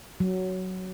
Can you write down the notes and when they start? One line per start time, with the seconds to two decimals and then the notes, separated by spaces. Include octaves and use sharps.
0.20 F#3